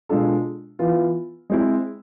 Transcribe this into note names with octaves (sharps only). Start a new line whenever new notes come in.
B2 G#3 D4 F4 A4
E3 B3 F4
G#3 C4 E4